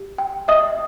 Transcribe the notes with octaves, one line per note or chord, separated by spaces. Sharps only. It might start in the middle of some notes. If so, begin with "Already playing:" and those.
Already playing: G4
G5
D#5 E5 D#6